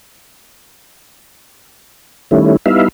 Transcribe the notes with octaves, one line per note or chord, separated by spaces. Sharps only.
D#3 G3 A3 C#4 E4
G3 B3 D#4 E4 E5 F5